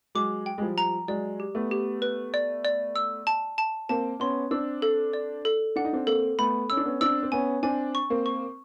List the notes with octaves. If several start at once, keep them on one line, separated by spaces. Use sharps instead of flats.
F#3 G#3 D6
G5
G#3
F3 G3
A#5
F#3 G#3 D5
G4
A3 B3
G4
B4
D5
D5
E6
A5
A5
A#3 C4 A5
B3 C#4 C6
C4 D4 E6
A4
D5
A4
D4 F#5
D#4
C4 D4
A#3 C4 A4
A3 B3 B5
C#4 E6
D4
B3 C#4
C4 D4 E6
C4
B3 C#4 G#5
C4 D4 G#5
C#6
A#3 C4
C#6